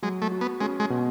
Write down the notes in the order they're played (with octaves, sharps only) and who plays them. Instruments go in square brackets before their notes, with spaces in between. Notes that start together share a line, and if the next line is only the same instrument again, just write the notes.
[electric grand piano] F#3 [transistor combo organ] G#3
[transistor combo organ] A3
[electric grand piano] F#4
[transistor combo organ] B3
[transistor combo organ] G#3 [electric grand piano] C#4
[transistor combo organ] G#3
[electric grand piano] B2